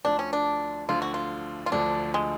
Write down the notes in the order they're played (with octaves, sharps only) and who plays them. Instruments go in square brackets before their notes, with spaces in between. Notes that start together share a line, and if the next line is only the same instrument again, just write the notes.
[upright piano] D2 D3 F3 [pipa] D4
[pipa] C#4
D4
[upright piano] D2 D3 F3 [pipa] F4
[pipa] F#4
F4
F4
[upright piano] D2 D3 F3 [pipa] D4
[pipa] G#3